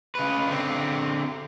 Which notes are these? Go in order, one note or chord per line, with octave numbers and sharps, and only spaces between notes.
C#3 B4
D3 C4